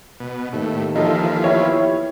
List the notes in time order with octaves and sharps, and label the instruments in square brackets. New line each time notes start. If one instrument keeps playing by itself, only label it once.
[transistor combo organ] B2
[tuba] D#2 [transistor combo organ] A2
[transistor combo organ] E3 F3 [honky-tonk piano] D#4 A4
[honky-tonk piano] B3 G4 C#5 [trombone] E4